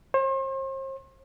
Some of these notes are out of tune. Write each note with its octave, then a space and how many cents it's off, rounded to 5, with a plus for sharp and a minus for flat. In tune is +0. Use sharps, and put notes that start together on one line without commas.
C5 +40